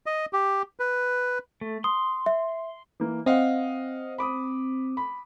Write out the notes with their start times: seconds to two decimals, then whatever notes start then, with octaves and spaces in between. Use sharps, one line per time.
0.06 D#5
0.33 G4
0.80 B4
1.61 A3
1.84 C6 D#6
2.26 E5
3.00 E3 A#3
3.26 C4 D#5 F5 F#5
4.18 B5 D6 D#6
4.97 B5